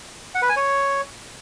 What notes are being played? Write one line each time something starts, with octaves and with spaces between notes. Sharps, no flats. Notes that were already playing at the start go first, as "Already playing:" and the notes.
F#5
B4
G#5
C#5